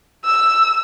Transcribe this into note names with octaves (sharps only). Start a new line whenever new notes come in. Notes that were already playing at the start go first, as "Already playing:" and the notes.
E6